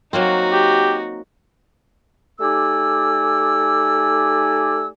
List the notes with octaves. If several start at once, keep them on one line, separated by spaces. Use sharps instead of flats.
F#3 A#3 C4 D#4 F#4
G4
A3 D#4 G4 D5 G#5 E6